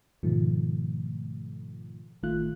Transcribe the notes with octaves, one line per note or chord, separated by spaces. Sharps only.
G#2 B2 D#3 F3 A3
A1 D#3 A3 F4 F#6